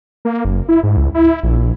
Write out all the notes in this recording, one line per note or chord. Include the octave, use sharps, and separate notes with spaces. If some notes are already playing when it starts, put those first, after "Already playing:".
A#3
F#1
E4
G#2
C#2
E4
A#1